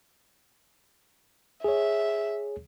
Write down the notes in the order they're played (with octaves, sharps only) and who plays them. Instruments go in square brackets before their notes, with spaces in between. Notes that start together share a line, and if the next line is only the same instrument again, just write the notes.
[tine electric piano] G#4 C#5 [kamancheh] E5